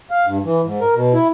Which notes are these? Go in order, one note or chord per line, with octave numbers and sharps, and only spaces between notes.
F5
G2
E3
G#2
A#4
B2
E4